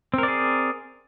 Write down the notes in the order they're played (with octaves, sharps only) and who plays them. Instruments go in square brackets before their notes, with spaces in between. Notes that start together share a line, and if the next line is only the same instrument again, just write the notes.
[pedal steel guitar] C4
A#4
D5
G#4